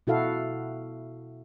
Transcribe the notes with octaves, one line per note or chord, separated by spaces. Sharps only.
B2 E4 F#4 A4 F5